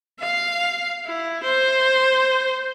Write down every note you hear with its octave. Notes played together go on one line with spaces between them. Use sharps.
F5
E4
C5